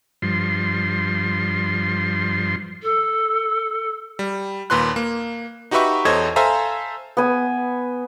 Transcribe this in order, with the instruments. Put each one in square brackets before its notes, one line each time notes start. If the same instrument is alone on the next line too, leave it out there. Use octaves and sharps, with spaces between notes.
[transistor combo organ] G2 F3 C6
[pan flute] A4
[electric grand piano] G3
D#2 A#2 B4 C6 F#6
A#3
D#4 F#4 G4 B4 E5 C#6
E2 A4 C5 C#5 D#5 G#6
A4 C5 E5 F5 G#5 A#5
[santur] B3 G#5